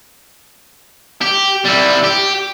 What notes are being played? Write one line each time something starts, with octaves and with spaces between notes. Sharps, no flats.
G4
G3 E4
G4